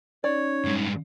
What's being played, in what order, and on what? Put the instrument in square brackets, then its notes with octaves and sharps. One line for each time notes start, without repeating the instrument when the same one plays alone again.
[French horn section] C#4 D#4 [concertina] C#5 [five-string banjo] D5
[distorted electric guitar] G2 G#3